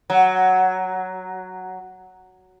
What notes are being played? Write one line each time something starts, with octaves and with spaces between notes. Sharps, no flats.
F#3